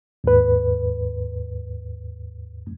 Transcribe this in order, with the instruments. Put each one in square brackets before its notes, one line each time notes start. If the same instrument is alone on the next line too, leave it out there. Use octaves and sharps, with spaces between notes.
[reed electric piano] D#2 G#2 B4